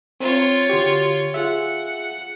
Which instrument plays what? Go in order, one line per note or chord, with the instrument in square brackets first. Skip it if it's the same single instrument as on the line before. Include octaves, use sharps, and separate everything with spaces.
[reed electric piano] C4 [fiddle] F4 C#5
[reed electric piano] D3 F#4 G4
[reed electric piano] F4 G#4 E5 [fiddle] F#5